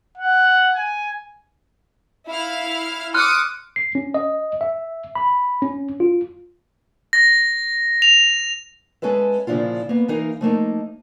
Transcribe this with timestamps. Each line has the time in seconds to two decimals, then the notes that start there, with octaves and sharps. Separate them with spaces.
0.18 F#5
0.75 G#5
2.28 E4 F5 F6
3.14 C6 D6 D#6 F6 F#6 C#7
3.76 C7
3.95 C#4
4.14 D#5
4.61 E5
5.15 B5
5.62 C#4
6.00 F4
7.13 A#6
8.02 F7
9.02 G#3 C#4 A4 B4 E5
9.47 A#2 C#3 F3 D4 E4 F4
9.89 A#3 B3
10.08 E3 A#3 D#4 A#4 F5
10.41 F3 A3 A#3 D#4